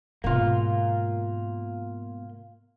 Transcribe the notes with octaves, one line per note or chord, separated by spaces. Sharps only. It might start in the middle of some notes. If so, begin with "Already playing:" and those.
G#2 B2 A#3 F4